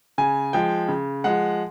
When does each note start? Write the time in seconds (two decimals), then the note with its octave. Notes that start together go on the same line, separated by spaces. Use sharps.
0.18 C#3 G#5
0.53 F3 G#3 G5
0.88 C#3
1.24 F3 G#3 F#5